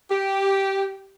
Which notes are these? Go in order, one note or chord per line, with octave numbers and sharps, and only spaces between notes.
G4